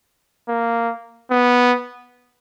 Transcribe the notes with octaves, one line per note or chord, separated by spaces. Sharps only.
A#3
B3